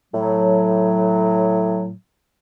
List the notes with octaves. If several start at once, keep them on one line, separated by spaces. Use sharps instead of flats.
A2 F#3